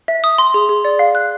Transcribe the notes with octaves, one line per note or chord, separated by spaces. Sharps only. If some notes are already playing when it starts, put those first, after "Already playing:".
E5
D#6
C6
G#4
G#4
D5
F5
F#6